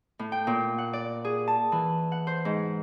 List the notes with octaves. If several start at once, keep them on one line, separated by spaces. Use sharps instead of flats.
A2
G5
A#2
F#5
D5
G#4
A5
E3
F#5
C5
G#2